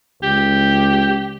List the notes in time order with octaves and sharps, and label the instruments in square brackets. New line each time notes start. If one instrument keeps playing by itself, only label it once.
[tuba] C#2 [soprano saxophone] G4